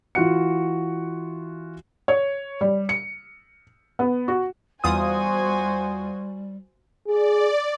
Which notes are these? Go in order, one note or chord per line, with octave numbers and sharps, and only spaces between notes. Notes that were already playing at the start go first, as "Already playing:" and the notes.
E3 F4 F#4 F#5 C#7
C#5
G3
C#7
B3
F#4
E2 G3 F4 F#4 C5 G#5 D#6
G#4 D5